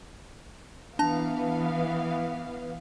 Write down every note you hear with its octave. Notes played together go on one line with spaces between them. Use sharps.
E3 B3 D4 F5 A5